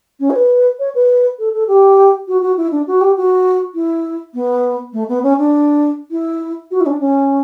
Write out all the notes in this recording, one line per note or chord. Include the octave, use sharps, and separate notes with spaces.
C#4
C#5
B4
C#5
B4
A4
A4
G4
F#4
F#4
E4
D4
F#4
G4
F#4
E4
B3
A3
B3
C#4
D4
E4
F#4
E4
C#4
D4
C#4